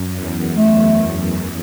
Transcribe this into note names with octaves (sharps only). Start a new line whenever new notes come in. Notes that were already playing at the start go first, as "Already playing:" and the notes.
Already playing: F#2
E2
F#2 A3